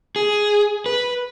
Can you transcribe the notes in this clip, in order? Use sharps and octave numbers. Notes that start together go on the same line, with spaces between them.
G#4
B4